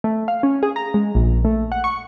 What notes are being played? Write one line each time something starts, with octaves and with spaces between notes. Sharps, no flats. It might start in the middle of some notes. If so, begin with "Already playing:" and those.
A3
F5
C#4
G#4
A#5
G#3
A#1
A3
F#5
C#6